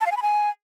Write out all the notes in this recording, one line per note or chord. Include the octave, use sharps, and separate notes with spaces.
A5
F5
G#5
B5
G#5